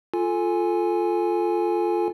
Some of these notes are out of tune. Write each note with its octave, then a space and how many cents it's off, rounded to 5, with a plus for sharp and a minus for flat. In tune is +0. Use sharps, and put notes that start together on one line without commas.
F4 +0 A4 -5 G#5 +0